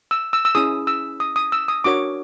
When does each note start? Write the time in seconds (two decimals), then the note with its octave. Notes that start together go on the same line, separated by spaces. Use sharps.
0.11 E6
0.33 E6
0.45 E6
0.55 C#4 E4 G#4 D#6
0.87 E6
1.20 D#6
1.36 D#6
1.52 E6
1.68 D#6
1.84 D4 F#4 A#4 C#5 D6